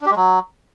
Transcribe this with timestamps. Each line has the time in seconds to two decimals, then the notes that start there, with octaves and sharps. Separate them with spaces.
0.01 D4
0.06 G4
0.11 G#3
0.16 F#3